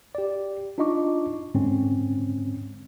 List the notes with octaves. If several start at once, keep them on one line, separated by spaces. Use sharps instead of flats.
G4 D5
D4 D#4 F4 D#5 C#6 D6
G#2 D3 G#3 C4 C#4